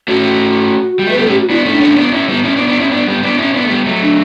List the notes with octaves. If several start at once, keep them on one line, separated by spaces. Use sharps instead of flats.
A3 C#4 F#4
G3
A3
G3 B3 B4
A4
A3 C#4
G4
F#4
B3 D4 E4
A3 C#4
D4
A3 C#4
B3 D4
C#4 E4
G3 B3
C#4 E4
B3 D4
B3 D4
C#4 E4
B3 D4
G3 B3
B3 D4
C#4 E4
B3 D4
A3
G3 B3
F#3 A3
D4